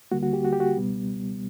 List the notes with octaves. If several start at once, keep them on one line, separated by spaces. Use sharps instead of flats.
D2 D3 G3 A#3 F#4
F#4
G4
F#4
G4
F#4
C#2 B2 G3 B3